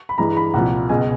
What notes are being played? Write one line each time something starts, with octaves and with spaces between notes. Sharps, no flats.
B5
G2 E3 G#3 A#5
B5
C2 A#2 F3 F#5
C#2 B2 G#3 G#5